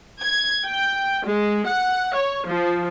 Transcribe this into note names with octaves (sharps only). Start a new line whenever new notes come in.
G#6
G5
G#3
F#5
C#5
F3